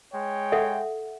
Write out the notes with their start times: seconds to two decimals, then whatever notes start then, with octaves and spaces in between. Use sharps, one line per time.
0.12 G#3 C#5 G5
0.52 A4 E5 F#5